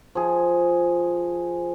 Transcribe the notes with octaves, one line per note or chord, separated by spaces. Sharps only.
F3 G#4